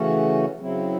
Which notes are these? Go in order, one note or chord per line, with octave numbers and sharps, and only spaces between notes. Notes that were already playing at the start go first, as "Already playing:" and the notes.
Already playing: C#3 E3 A3 C#4 F#4
C#3 F#3 C4 E4